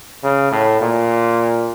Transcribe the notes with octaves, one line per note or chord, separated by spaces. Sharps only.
C#3
A2
A#2